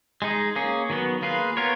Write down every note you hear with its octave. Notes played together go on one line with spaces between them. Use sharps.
G#3 D#4 G#4
A#3 C#4 G#4
D#3 F#3 B3
A#3 F4 G#4 B4
B3 F4 A#4 C#5